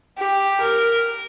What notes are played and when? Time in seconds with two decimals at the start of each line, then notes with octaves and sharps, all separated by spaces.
0.18 G4
0.60 A#4